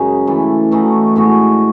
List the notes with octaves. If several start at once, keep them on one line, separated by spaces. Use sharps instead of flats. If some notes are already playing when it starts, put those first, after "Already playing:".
Already playing: F#2 C#3 G#3 D#4
E3 A3 E4 A4
E3 A3 D#4 F#4
A2 G#3 B3 F#4